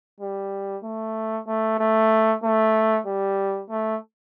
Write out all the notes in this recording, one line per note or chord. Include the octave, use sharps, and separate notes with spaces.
G3
A3
A3
A3
A3
G3
A3